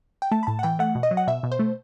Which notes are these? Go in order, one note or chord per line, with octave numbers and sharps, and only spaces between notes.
G5
A3 A5
B5
A2 A5
F#5
E3 G5
A3 F#5
B2
D#5
F#3
F#5
B2 E5
B2
C5
A3